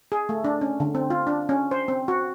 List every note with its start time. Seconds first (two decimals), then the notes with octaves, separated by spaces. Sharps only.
0.12 G#4
0.29 A3
0.44 D4
0.61 C#4
0.80 D3
0.95 C4
1.10 F4
1.27 D4
1.49 C#4
1.71 C5
1.88 C4
2.08 F#4